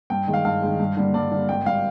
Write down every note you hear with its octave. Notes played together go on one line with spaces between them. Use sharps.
G2 G5
D#3 G#3
F5
G2 F5
D#3 G#3
G2
D3 G3 A#3
G2 D5
D3 G3 A#3
G#1 G5
G3 F5